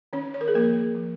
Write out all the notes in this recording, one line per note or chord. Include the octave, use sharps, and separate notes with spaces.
D#3 C#4 C#5
C#5
A#4
G#4
F3 A#3 A#4
F3